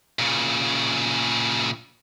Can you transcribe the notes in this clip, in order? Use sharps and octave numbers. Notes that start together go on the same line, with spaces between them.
A#2 C#3